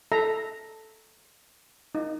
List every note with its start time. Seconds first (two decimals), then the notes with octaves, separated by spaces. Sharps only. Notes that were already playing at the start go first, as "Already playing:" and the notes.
0.12 A4 E5 A#5
1.95 D#4